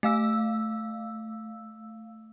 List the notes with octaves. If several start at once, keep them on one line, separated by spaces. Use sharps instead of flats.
A3 F5 E6